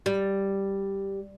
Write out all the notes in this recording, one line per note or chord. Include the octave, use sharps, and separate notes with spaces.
G3